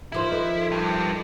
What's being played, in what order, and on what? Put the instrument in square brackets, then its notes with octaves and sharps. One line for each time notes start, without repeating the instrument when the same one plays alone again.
[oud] D#3 F3 C5 [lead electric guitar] E4
[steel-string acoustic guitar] A4 B4 D#5
[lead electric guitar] G2 G3